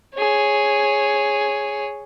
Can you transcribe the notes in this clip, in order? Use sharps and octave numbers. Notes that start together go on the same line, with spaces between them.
G#4 C#5